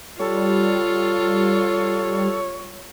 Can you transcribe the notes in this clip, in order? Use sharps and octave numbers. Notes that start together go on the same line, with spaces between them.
G3 F4 A4 C#5